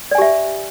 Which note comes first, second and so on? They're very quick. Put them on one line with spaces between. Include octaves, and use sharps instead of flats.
D5 G#5 G4 E5